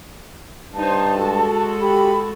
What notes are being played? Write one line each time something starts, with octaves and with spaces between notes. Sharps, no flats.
G2 D#4 C5 A5
G#3 F#4 A4
G4 B5